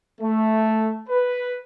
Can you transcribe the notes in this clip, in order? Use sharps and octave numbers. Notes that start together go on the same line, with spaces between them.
A3
B4